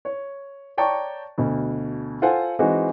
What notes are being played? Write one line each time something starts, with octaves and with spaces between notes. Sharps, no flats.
C#5
C#5 D5 G5 A5 A#5 C#6
D2 B2
F4 A4 C5 F#5 G#5
E3 G#3 C4 D#4 F#4